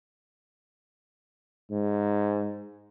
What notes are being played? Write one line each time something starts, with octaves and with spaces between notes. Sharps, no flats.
G#2